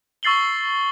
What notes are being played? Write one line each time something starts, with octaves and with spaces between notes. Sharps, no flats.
C#6 E6 A6 C7 F#7 G7